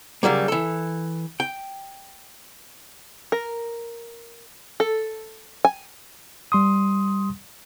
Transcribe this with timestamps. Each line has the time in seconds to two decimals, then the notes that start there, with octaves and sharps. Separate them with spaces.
0.23 C#3 F#3 G3 A#3
0.48 E3 A4
1.40 G5
3.32 A#4
4.80 A4
5.65 G#5
6.52 G3 C6 D#6